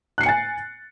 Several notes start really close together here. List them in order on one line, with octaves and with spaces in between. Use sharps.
F#6 C7 C#7 G#5 A6